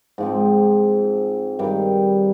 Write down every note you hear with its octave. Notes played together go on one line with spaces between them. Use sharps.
G#2 F3 C4
G2 D#3 G3